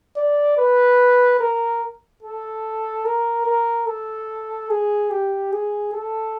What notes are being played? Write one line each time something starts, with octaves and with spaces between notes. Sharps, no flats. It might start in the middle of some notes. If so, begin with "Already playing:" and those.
D5
B4
A#4
A4
A#4
A#4
A4
G#4
G4
G#4
A4